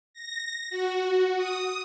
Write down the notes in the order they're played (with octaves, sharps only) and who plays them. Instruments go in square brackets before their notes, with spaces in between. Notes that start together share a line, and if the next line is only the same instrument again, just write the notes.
[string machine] A#6
F#4
D#6